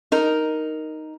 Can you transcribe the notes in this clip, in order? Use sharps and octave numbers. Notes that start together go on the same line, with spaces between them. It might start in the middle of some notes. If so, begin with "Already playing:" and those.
D#4 A#4